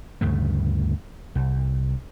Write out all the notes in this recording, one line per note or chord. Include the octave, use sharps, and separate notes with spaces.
D2 G2 C#3 A3
C2